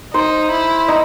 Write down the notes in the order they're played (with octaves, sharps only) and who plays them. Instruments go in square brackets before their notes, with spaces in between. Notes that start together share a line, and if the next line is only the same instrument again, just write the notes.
[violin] D#4 [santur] C5
[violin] E4
[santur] D#4